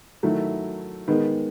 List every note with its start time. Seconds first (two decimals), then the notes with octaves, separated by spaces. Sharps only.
0.23 D#3 F#3 A3 E4
1.08 D#3 G#3 B3